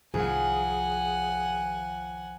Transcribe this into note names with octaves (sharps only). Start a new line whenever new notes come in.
C2 F2 D#3 G#4 F#5 G#5